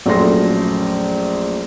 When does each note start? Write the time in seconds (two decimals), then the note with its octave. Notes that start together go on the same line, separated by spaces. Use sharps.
0.06 A#1 F#2 A3 C6 A#6